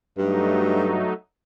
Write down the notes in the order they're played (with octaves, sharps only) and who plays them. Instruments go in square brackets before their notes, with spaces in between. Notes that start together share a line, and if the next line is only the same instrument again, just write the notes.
[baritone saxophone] G2 [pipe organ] F#3 A3 D#4